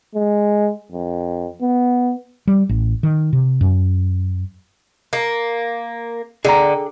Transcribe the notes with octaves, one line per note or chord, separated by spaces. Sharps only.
G#3
F2
B3
G3
A1
D#3
C3
F#2
A#3
D3 G#4 G5 A#5